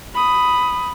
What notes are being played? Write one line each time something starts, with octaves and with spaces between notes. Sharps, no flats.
B5 D#6